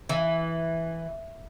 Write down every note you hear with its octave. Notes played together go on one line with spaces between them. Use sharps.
E3